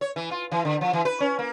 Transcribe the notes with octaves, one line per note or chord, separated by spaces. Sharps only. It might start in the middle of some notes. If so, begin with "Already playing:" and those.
C#5
E3
F4
E3
D3
F3
E3
B4
C#4
A#3